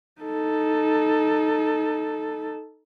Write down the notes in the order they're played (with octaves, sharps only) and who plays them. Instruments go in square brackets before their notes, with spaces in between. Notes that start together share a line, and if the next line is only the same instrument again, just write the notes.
[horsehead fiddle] D#4 A4